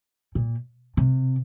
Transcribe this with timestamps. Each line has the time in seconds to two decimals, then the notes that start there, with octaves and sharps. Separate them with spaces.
0.35 A#2
0.97 C3